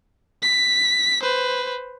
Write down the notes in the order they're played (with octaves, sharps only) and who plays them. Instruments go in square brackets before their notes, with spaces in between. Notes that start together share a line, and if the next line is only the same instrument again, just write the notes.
[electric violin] B6
B4 C5